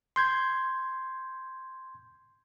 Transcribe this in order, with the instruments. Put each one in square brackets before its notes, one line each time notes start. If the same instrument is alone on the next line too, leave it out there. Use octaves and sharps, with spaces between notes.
[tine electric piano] C6 G6 G#6